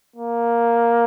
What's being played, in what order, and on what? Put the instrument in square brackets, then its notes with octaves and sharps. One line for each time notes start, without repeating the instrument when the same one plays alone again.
[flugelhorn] A#3